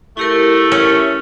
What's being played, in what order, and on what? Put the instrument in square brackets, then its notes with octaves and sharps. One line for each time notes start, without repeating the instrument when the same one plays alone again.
[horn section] A3 [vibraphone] E4 G4 A#4
[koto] C#4